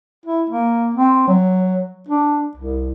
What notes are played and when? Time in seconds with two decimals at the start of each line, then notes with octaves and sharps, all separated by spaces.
0.26 E4
0.50 A#3
0.95 C4
1.28 F#3
2.09 D4
2.57 C2